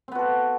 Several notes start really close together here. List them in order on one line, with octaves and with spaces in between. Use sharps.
C4 B3 F#4 A4